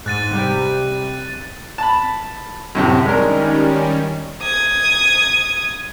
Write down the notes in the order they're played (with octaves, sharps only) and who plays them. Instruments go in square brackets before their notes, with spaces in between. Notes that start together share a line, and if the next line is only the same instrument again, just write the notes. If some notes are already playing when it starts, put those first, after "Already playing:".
[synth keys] G#2 [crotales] F#6 A6 D#7
[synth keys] C3 G3 G4
[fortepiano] A5 B5
F#2 A2 C3
[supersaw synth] D#3 G3 C#4 [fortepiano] G#3 D4 A#4
[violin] D#6 G#6